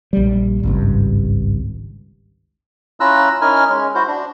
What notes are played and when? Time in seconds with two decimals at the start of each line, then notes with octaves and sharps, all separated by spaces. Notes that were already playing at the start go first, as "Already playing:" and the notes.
0.13 A#1 G3
0.63 G#1 C#2 G2
3.00 C#4 E4 F4 A#5 E6 F#6
3.41 C#4 D#4 E4 A#4 G#5 F6
3.69 G#3 C#4
3.95 E4 F#4 C5
4.08 D4